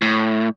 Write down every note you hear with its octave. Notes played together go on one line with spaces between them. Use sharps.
A2